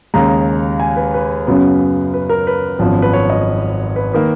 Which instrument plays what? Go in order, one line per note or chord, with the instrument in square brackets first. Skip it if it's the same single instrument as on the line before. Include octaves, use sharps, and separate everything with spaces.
[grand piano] D#2 C#3 G#3 A#5
G#5
B4
B4
F#2 C#3 F#3 B3
B4
A#4
B4
G#1 F#2 F3 B3
B4
C#5
D#5
B4
D#3 A#3 B4